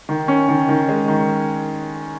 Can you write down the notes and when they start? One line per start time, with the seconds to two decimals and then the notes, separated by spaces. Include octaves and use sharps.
0.09 D#3
0.28 C#4
0.49 D#3
0.69 D#3
0.89 G#3
1.08 D#3